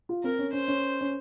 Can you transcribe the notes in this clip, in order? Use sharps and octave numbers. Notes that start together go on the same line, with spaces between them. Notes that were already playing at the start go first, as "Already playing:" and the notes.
F4
C4 A#4
C#4
C#4 C5
C#4
C#4